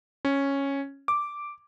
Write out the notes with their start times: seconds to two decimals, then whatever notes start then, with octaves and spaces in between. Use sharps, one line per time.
0.25 C#4
1.08 D6